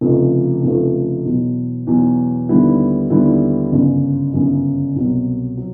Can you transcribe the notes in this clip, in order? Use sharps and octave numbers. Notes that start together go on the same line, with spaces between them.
F1 F2 C#3 F3 A3
F1 F2 C#3 F3 A3
E2 B2 F#3
E2 B2 F#3
D#2 D3 G3 B3 E4
D#2 D3 G3 B3 E4
G1 F#2 C#3
G1 F#2 C#3
C2 B2 F#3
F#3